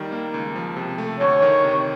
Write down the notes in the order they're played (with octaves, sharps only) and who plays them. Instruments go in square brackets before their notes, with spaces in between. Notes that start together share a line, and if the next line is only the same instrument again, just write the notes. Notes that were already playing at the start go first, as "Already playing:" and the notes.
Already playing: [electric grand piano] D#2 D#3 G3
A#3
C#2
F3
C3
A3
[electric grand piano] D2 [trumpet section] C#5
[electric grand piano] D#3
C3